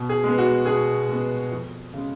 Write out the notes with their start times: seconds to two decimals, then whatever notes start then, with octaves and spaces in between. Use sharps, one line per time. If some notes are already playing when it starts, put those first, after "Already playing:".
Already playing: B2
0.09 G#4
0.24 G#3 B3
0.38 F#4
0.66 B2 G#4
1.09 G#3 B3
1.51 F2
1.93 C#3 G#3